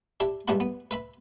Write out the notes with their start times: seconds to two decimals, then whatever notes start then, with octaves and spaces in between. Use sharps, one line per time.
0.20 D4 E4 G4
0.48 C#2 G2 D4 E4 F#5 B5
0.60 B3
0.91 B4 E5 B5